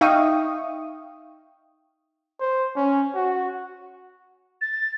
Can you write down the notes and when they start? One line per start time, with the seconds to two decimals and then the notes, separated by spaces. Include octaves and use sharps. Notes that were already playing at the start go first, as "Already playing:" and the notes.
0.01 D#4 E5 F5 G5 C#6 D#6
2.40 C5
2.76 C#4
3.15 F#4
4.61 A6